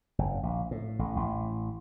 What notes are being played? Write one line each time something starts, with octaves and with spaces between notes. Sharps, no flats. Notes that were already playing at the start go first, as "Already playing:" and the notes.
F#1
A#1
A2
A1
A1